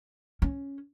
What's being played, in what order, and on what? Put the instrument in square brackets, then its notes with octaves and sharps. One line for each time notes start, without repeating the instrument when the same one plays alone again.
[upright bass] C#4